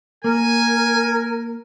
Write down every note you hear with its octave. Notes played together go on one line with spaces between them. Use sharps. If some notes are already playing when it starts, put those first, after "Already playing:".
A#3 A#4 G#5